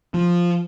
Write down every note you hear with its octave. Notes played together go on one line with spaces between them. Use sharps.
F3